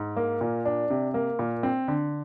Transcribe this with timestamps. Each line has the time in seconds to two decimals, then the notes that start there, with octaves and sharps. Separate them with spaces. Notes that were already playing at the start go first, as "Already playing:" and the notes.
Already playing: G#2
0.17 A#3
0.41 A#2
0.65 D4
0.90 C3
1.14 A#3
1.39 A#2
1.63 C4
1.88 D3